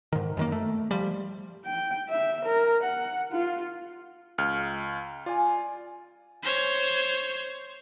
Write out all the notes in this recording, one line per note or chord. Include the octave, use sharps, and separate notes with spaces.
G#2 D#3
F#2 D#3 A#3
A3
F3 G3
G5
E5
A#4
F#5
F4
C#2 F6
F4 D5 G#5
C5 C#5